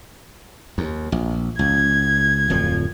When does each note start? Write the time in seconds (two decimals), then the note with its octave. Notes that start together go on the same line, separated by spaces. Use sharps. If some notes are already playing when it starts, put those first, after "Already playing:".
0.78 D#2
1.12 A#1
1.59 C#2 G#6
2.50 D1 F2 F3